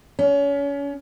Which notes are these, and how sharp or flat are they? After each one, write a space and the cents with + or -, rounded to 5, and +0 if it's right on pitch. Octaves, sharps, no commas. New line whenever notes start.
C#4 +30